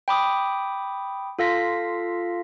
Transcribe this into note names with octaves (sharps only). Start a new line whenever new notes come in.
G5 B5 D6 D#6
F4 A4 F5 A#6 B6